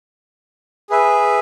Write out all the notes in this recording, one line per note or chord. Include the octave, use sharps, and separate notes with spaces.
G#4 B4 E5